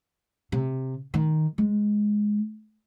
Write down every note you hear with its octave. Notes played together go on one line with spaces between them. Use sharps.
C3
D#3
G#3